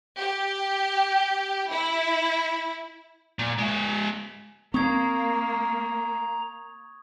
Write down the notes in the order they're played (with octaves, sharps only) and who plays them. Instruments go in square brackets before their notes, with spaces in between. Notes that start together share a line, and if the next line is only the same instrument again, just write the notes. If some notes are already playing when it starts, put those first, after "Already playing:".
[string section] G4
E4
[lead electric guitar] A#2
G#3 E5
[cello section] A#3 [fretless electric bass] C4 [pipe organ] A#5 [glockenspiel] C#6 D#6 G#6